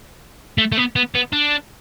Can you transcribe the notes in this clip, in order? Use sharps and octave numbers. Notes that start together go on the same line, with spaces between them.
A3
A3
B3
B3
B3
D4